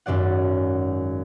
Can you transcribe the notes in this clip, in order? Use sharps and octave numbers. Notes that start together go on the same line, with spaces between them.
G#1 F#2 F#3 D5 F#5